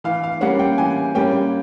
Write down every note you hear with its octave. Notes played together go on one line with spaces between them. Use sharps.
E3 F5
F5
G3 A#3 C#4 F#5
G5
E3 G#5
G3 A#3 C#4 G5